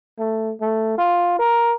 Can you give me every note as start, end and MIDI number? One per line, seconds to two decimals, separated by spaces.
0.19 0.51 57
0.61 0.96 57
0.98 1.37 65
1.39 1.74 70